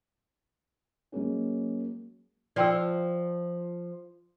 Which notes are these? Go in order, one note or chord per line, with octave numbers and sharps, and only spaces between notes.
F#3 G#3 A#3 C#4
F3 F4 D5 G5 E6